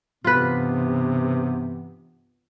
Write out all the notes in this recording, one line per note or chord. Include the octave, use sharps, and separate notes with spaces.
G2 C3 E3 B3 F4 B4